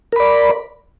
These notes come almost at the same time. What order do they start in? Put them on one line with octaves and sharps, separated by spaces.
A#4 B5 D5